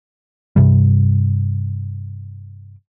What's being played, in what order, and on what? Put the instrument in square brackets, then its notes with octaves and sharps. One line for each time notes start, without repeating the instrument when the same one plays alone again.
[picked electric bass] G2 C3 G3